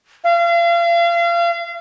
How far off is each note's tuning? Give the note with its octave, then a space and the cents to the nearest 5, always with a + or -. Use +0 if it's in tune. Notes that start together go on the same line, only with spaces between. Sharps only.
F5 -35